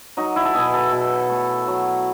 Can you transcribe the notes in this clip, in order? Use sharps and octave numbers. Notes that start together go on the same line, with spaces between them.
F#3 D#4
E4
A4
B2 G#4
A4
B2
A3
F#3